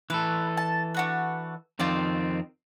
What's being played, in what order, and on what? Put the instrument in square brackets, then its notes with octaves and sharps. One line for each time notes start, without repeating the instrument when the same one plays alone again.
[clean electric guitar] E3 A4 [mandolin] B4
[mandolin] A5
D4 F#4 B4
[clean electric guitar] F2 D#3 C4 [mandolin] F4 D5